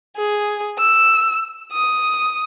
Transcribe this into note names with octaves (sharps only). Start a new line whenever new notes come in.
G#4
E6
D#6